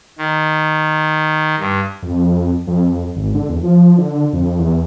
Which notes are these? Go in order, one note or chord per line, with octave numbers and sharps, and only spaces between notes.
D#3
G2
F2
F2
G#1
D3
E2
F3
D3
F2
E2